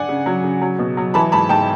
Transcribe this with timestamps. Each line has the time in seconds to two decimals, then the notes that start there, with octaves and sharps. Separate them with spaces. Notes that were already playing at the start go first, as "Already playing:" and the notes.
Already playing: D4 F#5 G#5
0.08 C#3
0.26 F#3
0.44 C#3
0.62 F#3
0.79 B2
0.97 F#3
1.14 E3 A5 B5
1.32 G#2 A5 B5
1.49 G#2 G5 A5